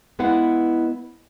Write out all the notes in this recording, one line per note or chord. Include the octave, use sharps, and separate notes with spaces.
G#3 B3 E4 B4 F5 F#5